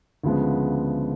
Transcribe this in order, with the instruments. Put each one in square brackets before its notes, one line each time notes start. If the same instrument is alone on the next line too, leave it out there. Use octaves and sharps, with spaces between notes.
[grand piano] D2 C#3 F3 G#3 B3